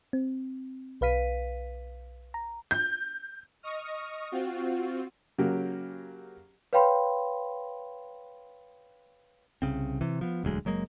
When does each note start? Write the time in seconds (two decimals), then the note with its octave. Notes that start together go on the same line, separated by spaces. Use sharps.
0.13 C4
1.01 B1 B4 F5 B6 D#7
2.34 A#5
2.71 G6
3.63 D#5 C#6 D#6 F6 A#6
4.32 C4 F4 F#4
5.38 C#3 F#3 A#3 G4
6.73 B4 C#5 F5 G5 B5 C6
9.62 C2 C#3 C4
10.01 C3 E3
10.21 F3 B3
10.44 E1 D2 F#3 G#3
10.65 F#1 F#3 G#3 A#3